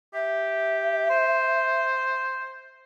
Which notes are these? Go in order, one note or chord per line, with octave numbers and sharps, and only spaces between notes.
G4 E5
C5